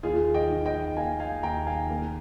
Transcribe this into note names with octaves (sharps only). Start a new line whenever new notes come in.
D#2 F4 G#4
D#5 G5
D#3
D#5 G5
A#3 F5 G#5
F5 G#5
D#2 G5 A#5
F5 G#5
A#3